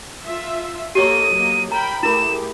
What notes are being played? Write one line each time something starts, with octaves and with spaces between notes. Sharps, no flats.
F4 E5
A#3 G4 A4 C#5 D#5 C#6 D#7
F#3 A#3 D#5
A#4 G5 A#5 B5
A3 E4 G4 G#4 A#4 B5 E7